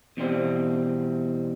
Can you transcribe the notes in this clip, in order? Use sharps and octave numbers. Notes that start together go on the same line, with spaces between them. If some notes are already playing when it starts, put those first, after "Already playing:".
E2 B2 G3 C4